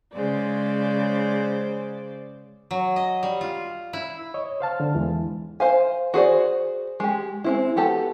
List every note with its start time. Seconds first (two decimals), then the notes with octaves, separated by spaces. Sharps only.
0.14 C#3 G#3 C5 D5
2.71 F#3
2.96 D#5
3.23 G3
3.41 F4
3.93 E4
4.34 C#5 D#5
4.60 C5 F5 A5 F6
4.80 D3
4.94 E2 E3 G#3
5.60 C5 F5 G#5
6.14 F#4 G#4 C5 D5
7.00 G#3 G4
7.44 G#3 C4 E4
7.76 B3 F#4 G4 A4 A5